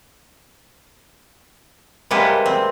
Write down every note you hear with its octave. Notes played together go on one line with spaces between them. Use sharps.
C3 G3 G#3 A#3 B4 F#5
C4